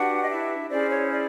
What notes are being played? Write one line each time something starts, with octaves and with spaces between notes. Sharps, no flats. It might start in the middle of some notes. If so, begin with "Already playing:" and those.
Already playing: D4 F#4 G4 B4 F#5
D#5
E4 E5
C#4 E4 G#4 C5 D5
C#5
D5